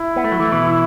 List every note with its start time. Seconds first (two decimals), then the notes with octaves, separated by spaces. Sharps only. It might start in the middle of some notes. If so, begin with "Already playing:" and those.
Already playing: E4
0.16 B3
0.24 A3
0.32 F#3
0.40 E3 A3
0.52 B2 E3